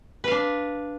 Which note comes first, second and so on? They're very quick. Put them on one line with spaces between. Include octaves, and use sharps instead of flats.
B4 F5 D4